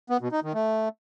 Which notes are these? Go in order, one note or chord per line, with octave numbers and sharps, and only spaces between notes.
B3
B2
D#4
D#3
A3